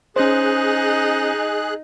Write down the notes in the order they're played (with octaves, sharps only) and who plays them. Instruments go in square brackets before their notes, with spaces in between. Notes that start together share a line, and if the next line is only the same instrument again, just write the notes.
[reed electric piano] C#4 C5 [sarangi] D#4 [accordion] G#4 F#6